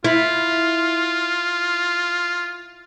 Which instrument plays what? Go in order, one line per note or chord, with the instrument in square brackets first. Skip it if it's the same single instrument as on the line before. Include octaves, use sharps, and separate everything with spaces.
[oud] E4 [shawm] F4